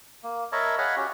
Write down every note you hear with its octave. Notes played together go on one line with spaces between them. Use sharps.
A#3
A#4 C#5 D#5 E5 A5 B5
G#4 C#5 D#5 F5 F#5 B5
C#4 F#4 G4